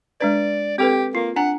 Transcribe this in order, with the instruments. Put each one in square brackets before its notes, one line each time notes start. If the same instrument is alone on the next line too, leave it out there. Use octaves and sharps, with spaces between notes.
[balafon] G#3 D4 B4 [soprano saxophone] D5
[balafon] C4 A4 B4 [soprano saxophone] G4
[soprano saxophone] A#3 [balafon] F4
[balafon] D4 G#5 A#5 [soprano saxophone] F#5